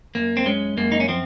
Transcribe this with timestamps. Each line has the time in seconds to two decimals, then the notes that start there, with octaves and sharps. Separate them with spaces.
0.15 F#2 A#3
0.37 C4
0.46 G#3 C#4
0.77 F#2 A#3
0.92 D#4
1.00 C#4
1.08 F3 C4